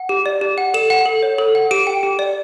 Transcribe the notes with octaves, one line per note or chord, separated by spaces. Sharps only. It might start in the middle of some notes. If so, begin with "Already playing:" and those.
Already playing: F#5
G4
D5
G4
F#5
A4 E7
F#5
A4
C#5
A4
F#5
G4 D7
G5
G4
D5